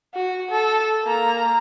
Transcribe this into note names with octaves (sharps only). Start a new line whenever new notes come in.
F#4
A4
A#3 A#5